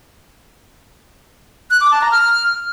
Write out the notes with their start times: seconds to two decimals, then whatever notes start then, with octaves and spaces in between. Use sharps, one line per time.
1.71 F#6
1.81 D6
1.91 A5
2.01 A#5
2.12 F6